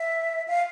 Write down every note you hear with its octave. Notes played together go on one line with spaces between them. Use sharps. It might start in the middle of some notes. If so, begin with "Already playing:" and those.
Already playing: E5
F5